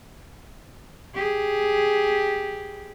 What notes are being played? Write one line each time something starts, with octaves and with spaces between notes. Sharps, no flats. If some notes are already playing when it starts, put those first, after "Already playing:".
G4 G#4